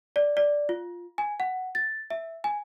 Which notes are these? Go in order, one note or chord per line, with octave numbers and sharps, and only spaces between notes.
D5
D5
F4
G#5
F#5
A6
E5
G#5